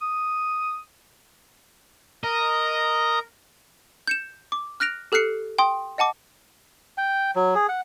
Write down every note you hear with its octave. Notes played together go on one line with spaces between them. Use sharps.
D#6
A#4 D#5 A#5
G6 C#7 E7
D6
F6 F#6 A#6 D7 F7
G4 A4 F6 F#6 C7 C#7
G5 C6 D#6
D#5 F#5 A5 D6
G5
F#3
G#4
F#5